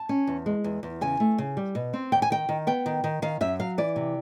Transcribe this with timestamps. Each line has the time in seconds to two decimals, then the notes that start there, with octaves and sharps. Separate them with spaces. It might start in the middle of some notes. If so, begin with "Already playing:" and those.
Already playing: A5
0.09 C#4
0.27 E2
0.46 G#3
0.64 E2
0.83 E2
1.01 C#3 G#5
1.20 A3
1.38 C#3
1.57 G3
1.75 B2
1.93 C4
2.12 D#2 G5
2.22 G#5
2.30 D#3 G5
2.49 D#3
2.67 B3 G5
2.86 D#3
3.04 D#3
3.22 D#3 F5
3.41 F#2 E5
3.59 F#3 F5
3.78 E3 D5
3.96 C3